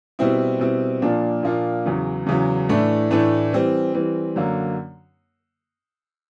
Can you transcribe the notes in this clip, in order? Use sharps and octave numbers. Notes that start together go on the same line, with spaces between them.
B2 G3 C4 E4
B2 G3 C4 E4
A#2 F3 A#3 D4 F4
A#2 F3 A#3 D4 F4
E2 C#3 F#3
E2 C#3 F#3
A2 E3 A3 D4
A2 E3 A3 D4
E3 G3 C4
E3 G3 C4
F#2 D3 F#3 A#3